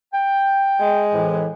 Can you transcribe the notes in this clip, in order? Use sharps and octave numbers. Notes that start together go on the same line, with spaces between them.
G5
G#3
F2 A2 E3